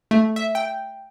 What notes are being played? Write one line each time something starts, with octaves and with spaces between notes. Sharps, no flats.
A3
E5
G5